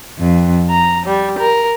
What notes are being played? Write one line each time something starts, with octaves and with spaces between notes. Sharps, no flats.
F2
A#5
G3
A#4